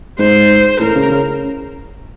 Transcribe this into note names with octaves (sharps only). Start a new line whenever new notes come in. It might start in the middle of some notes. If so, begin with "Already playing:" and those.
G#2 C5
A2 A#4
C#3
C#3